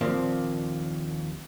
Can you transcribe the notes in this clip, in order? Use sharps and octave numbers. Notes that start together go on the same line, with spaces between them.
D#2 A#2 F3 C4 D5 C6